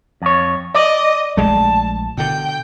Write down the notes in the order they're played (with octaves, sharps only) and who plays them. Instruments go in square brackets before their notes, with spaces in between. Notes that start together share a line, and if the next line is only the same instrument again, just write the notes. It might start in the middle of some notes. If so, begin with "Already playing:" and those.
[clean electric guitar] F2 C#5
[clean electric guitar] D5 [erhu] D#5
[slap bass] A#1 G#3 A3 [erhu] A5
[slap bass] B2 D3 [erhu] G5